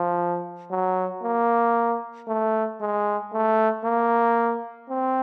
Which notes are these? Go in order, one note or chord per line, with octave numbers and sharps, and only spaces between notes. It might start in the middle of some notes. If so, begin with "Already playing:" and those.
Already playing: F3
F#3
A#3
A3
G#3
A3
A#3
C4